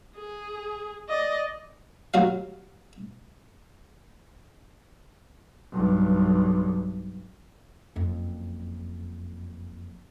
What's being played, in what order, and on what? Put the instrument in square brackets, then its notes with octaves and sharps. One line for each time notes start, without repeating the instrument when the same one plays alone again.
[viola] G#4
D5 D#5
[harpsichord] D#2 F#3 F#4 F5
[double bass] B1 G2
[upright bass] F#1 F2